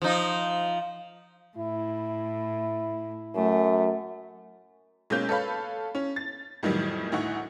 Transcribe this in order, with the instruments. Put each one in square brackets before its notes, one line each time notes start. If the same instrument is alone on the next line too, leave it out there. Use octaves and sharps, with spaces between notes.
[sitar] F3 D#4
[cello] A2 [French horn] E4
[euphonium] F#2 [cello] A3
[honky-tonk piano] B1 G#3 A#3 C#4 G6
A4 B4 C#5 F5 B5
C#4
A6
F2 A2 D#3 E3 F#3 G3
D2 A2 D#4 E4 F#5 C#6